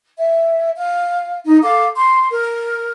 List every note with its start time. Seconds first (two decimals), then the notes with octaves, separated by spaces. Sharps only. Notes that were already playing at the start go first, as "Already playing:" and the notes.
0.18 E5
0.77 F5
1.45 D#4
1.63 A4 F5 D6
1.97 C6
2.30 A#4